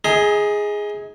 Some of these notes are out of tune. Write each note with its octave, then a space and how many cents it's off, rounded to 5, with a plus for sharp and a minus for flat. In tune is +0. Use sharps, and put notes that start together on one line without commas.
D#4 +30 G#4 +0 A#5 -45